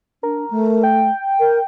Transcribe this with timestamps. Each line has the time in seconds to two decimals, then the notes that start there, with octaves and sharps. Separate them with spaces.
0.23 D4 A#4
0.50 A3
0.83 G5
1.39 A#4